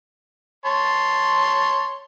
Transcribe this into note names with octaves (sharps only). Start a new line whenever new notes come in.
C#5 A5 C6